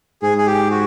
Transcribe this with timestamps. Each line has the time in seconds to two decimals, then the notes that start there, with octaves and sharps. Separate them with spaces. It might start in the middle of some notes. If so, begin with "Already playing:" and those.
0.22 G#2 G#4
0.38 G#4
0.46 G4
0.71 F#4